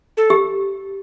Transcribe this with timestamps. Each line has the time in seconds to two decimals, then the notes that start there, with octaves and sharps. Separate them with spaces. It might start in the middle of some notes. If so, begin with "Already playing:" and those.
0.17 A4
0.30 G4